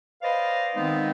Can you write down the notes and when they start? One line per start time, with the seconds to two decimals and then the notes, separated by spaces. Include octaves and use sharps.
0.22 B4 C5 D5 D#5 F5
0.75 D#3 G#3 B3 C4 D#4